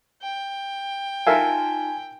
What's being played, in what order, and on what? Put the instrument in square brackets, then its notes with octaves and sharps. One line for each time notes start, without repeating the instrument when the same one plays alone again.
[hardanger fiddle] G5
[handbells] D#4 F4 A5 [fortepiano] A#4 E5 F5 [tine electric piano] G#5